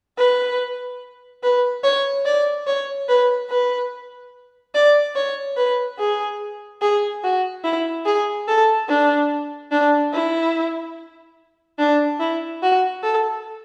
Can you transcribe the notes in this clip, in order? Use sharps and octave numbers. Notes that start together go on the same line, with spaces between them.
B4
B4
C#5
D5
C#5
B4
B4
D5
C#5
B4
G#4
G#4
F#4
E4
G#4
A4
D4
D4
E4
D4
E4
F#4
A4